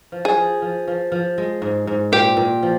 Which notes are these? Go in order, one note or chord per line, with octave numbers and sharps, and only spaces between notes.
F3
G#4
F3
F3
F3
F3
G#3
G#2
G#2
A#2 G4
A#2
F3